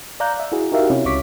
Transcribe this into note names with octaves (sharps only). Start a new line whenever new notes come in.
D5 F5 A#5 F#6 G6
E5
E4 F#4 G#4
D#4 F#4 G4 A#4 E5 F5
C3 C#4 E4
C#2 C#4 C#6 D6 B6